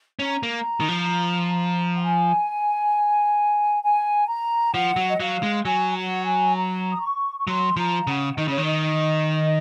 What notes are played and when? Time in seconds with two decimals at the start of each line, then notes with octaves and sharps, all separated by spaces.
0.19 C#4 A#5
0.43 A#3
0.80 D#3
0.88 F3
1.97 F#5
2.02 G#5
3.83 G#5
4.29 A#5
4.74 F3 F#5
4.96 F#3
5.08 D#5
5.20 F#3 F5
5.43 G#3
5.65 F#3 G#5
5.96 F#5
6.25 G#5
6.56 A#5
6.91 D#6
7.01 C#6
7.38 C#6
7.47 F#3 C6
7.76 F3 A#5
8.01 F5
8.07 C#3 F#5
8.38 D#3 D#5
8.48 C#3 C#5
8.58 D#3
8.64 D#5